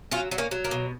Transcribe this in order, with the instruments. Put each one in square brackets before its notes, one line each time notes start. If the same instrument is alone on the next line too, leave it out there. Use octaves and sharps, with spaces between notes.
[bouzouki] F#3 C#4 F4
F#3
A#3 C#4
F#3
A#3
B2